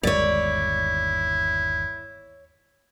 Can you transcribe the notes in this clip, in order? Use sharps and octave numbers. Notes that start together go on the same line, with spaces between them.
G1 D#2 G#3 E4 C#5 D5